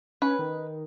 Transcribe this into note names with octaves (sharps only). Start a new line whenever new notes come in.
C#4 B4
D#3